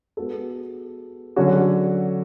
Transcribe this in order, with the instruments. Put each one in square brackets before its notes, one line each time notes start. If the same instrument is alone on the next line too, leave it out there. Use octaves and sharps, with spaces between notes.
[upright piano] G#3 B3 F#4 A4
D3 F#3 C#4 F#4